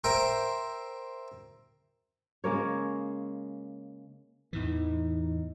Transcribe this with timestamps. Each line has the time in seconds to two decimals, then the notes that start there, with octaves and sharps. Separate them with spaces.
0.04 A#4 C5 E5 G5
2.44 C#3 G#3 A#3 C#5
4.53 E2 A2 E3 D#4